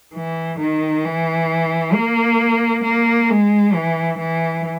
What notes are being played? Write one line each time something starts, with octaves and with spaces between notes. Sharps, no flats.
E3
D#3
E3
A#3
A#3
G#3
E3
E3